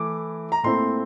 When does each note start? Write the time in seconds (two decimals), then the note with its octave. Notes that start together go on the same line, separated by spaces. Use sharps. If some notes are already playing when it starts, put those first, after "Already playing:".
Already playing: E3 A3 E4 D6
0.52 A#5
0.63 A#2 A3 C4 E4 C6